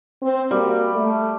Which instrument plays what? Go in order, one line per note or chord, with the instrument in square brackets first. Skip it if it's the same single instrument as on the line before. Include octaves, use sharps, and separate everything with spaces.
[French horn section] C4
[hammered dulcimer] G3 [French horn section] A#3 F#4 A#4
[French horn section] A3